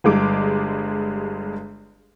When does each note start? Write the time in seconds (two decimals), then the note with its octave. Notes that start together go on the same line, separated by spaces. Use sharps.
0.04 G1 G2 G#3 D6